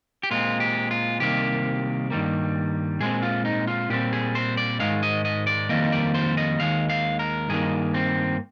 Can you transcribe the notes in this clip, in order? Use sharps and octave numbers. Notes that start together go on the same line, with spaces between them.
G4
A#2 G#3 C4 F4
G4
F4
C2 C3 D#3 A#3 G4
G2 D#3 G3 A#3
A#2 G#3 C4 G#4
F4
D#4
F4
A#2 G3 C4 G4
G#4
C5
D5
G#2 D#3 G#3 F5
D#5
D#5
D5
F2 D#3 G3 A#3 D#5
D5
C5
D#5
D#2 D#3 G#3 F5
F5
A#4
G2 D#3 A#3 G#4
C4